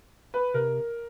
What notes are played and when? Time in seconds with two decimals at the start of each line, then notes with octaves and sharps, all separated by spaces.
0.34 B4
0.54 C3 A#4